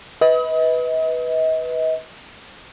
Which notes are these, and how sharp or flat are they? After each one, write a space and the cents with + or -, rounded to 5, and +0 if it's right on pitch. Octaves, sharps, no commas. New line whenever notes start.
B4 +0 D#5 +40